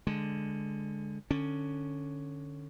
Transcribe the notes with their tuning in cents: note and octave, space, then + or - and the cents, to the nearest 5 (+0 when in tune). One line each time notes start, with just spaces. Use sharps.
D3 +0 G#3 +0
D3 +15 C#4 +0